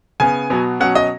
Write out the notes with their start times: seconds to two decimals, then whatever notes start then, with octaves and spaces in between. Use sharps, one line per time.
0.20 C#3 B3 G#5
0.50 B2 F#3 B3
0.80 B2 F#3 C#4 F#5
0.95 D#5